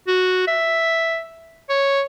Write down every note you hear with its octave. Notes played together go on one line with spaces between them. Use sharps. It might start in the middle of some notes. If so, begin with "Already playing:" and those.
F#4
E5
C#5